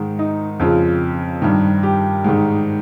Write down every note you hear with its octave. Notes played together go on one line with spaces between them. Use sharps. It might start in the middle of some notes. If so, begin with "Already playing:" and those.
Already playing: G#2 D#3
D#4
F2 C#3 F4
G2 D#3
G4
G#2 D#3